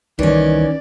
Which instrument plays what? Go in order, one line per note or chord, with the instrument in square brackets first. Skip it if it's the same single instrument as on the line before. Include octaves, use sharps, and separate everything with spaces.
[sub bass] C2 [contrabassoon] D#3 [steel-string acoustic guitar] E3 C#4 [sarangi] D5